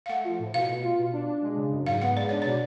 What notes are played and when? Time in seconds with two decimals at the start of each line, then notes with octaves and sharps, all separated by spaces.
0.06 F5
0.09 A3 F#5
0.24 F3
0.39 A2
0.54 B2 F5
0.68 B2
0.83 F4
0.98 B2
1.13 D4
1.28 D4
1.42 G#3
1.56 C#3
1.72 F#2
1.86 G#2 F5
2.02 B3 F#5
2.17 G#3 D5
2.29 D4 C#5
2.42 B2 D5